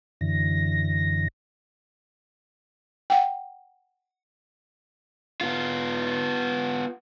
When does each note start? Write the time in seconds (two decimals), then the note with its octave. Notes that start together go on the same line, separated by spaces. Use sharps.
0.21 F#2 D3 E3 A#6
3.10 F#5 G5
5.41 B3 F4